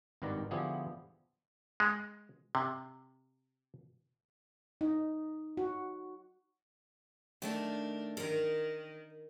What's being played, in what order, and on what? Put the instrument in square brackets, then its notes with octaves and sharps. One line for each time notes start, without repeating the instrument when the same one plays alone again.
[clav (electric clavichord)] G#1 G2 D#3 B4 D5 A#5
D3 F3 B3 E4 G4 G#4
G#3
C3
[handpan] D#4
F#4
[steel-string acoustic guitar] D#3 A3 A#4 [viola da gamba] D4
[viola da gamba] D#3 [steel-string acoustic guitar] A#4 A#5